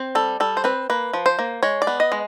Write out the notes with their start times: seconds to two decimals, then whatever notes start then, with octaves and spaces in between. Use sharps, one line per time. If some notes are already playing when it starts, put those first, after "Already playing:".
Already playing: C4
0.15 G3 A4
0.40 G3 A4
0.57 C5
0.64 C4 B4
0.90 A#3 B4
1.13 F3
1.26 C5
1.39 A#3
1.63 G#3 C#5
1.82 D5
1.87 B3
2.00 D#5
2.12 G#3